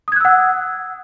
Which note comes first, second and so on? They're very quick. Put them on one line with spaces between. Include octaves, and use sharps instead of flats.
D#6 G#6 F#6 E6 F#5